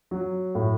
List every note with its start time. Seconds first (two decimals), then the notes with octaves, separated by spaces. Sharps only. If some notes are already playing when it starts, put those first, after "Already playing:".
0.11 F#3
0.55 A2